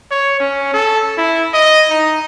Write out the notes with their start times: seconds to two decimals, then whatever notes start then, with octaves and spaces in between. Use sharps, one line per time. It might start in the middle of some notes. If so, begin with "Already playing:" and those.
0.11 C#5
0.40 C#4
0.74 A4
1.18 E4
1.53 D#5
1.90 D#4